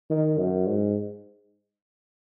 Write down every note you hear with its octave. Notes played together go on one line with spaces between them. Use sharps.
D#3
F#2
G#2